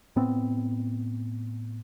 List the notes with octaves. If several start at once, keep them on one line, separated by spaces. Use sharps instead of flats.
A2 B3 C4